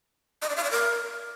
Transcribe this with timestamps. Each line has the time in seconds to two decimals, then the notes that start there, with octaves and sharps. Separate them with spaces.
0.42 D#5
0.49 D5
0.56 F5
0.64 D5
0.71 A#4